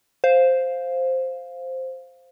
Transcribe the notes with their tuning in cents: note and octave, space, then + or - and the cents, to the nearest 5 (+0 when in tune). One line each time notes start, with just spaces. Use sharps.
C5 +0 F5 +5